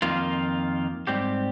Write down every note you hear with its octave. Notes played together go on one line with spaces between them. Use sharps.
F2 D#3 A#3 F4
G#2 G3 C4 G4